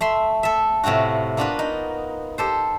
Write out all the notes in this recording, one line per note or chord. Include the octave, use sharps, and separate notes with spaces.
A3 E5 C6
A4 E5
A2 C3 C4 F4 F#4
A#3 B3 D4 F4 F#4 B4
D#4
G4 A4 C5